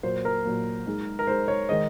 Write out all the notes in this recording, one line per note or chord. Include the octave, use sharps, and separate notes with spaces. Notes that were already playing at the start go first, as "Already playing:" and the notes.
A#2 F#3 A#3 C5
A#4
A#2 F#3 A#3
G#3 D#4 G#4
A#4
G#3 D#4 G#4 C5
C#5
D#3 G#3 D#4 G#4 C5 D#5